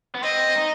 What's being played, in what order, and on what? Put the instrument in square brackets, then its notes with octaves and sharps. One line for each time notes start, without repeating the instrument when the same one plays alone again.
[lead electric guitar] B3
[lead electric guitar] C4 [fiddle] D#5
[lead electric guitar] D#4